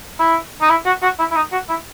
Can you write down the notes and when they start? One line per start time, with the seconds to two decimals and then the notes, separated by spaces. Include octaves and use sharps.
0.20 E4
0.62 D#4
0.69 E4
0.86 F#4
1.02 F#4
1.19 E4
1.31 E4
1.36 D#4
1.52 F#4
1.69 E4